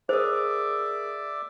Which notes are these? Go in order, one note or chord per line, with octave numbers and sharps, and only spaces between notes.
G#4 A#4 C5 D5 E5 D6 D#6